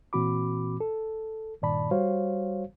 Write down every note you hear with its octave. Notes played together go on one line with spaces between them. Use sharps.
A#2 E3 C4 F#4 B5 D6
A4
G2 A#2 D#3 D5 A5 B5
G3 F#4 C5 C#5 F5